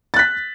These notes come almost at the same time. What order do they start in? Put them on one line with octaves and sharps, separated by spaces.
A6 F#6 B6